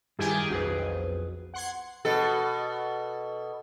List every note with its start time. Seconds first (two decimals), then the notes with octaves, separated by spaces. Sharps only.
0.19 G2 D#3 E4 G4 G#4 G#5
0.50 B1 F2 F#4 G#4 B4
1.54 F#5 C6 G#6
2.05 B2 A4